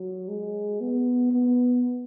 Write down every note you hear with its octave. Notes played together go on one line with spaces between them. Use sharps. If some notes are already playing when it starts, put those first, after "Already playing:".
Already playing: F#3
G#3
B3
B3